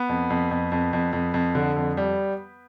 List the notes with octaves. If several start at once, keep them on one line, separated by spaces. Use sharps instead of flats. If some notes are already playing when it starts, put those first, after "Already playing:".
Already playing: B3
F2
F2
F2
F2
F2
F2
F2
D3
F2
G3